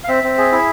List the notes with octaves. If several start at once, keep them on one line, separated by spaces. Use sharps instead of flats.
F5
C4 E5
C4
G#4
E4